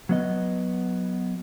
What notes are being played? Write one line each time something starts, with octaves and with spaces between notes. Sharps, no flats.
F#3 B3 D#5